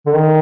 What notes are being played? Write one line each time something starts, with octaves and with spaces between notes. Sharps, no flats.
D3
D#3